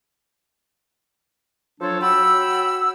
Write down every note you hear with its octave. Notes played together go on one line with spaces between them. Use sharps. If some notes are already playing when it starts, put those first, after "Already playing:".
F3 F#3 D4 A4 C5 C#5
F#4 C#5 G5 B5 E6